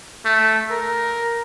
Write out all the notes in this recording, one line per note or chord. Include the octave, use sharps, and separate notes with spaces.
A3
A#4